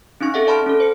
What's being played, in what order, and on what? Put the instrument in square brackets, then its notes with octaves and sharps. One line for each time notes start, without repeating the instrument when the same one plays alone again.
[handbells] C4 C#4 D#4 C#6 A#6
G#4 A4 E5 F#5
D5 A5 B5 C6 F6 D7
C#4 A4
C5 C#7